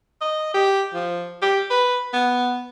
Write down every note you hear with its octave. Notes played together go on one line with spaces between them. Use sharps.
D#5
G4
F3
G4
B4
B3